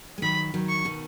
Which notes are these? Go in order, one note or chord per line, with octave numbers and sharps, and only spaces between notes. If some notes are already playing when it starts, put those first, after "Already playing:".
G#3
D#3 F#3 B5
D#3 F#3
C#6
B2 D#3